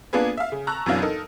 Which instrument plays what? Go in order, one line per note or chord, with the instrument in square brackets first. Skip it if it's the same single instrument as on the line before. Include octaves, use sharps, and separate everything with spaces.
[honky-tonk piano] A#3 B3 D4 F4 G#4 B4
E5 F5
C#3
A5 A#5 C#6 E6 F#6
F#2 B2 E3 F#3 D4 F5
D#4 A4 A#4